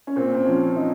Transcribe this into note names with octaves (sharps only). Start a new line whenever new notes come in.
C#4
A#2 C4
C4
F3 C#4
C#4
F3 D#4